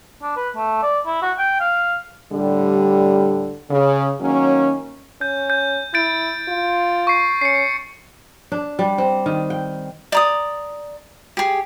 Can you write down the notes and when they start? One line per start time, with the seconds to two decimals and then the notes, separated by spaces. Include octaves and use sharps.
0.22 D4
0.37 B4
0.56 A3
0.83 D5
1.06 E4
1.22 F#4
1.38 G5
1.60 F5
2.33 A2 D3 G3
3.71 C#3
4.21 D#3 F#3 A#3 C#4
5.21 C#4 G6
5.50 G6
5.94 E4 G6 A6 D7
6.48 F4
7.07 C#6 C7
7.41 C#4 C7 C#7
8.52 D4
8.79 G3
8.98 C4
9.26 D#3
9.50 G5
10.12 D5 A#5 D#6
11.37 G4 G#4